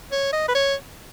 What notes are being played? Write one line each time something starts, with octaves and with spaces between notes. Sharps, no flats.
C#5
D#5
B4
C#5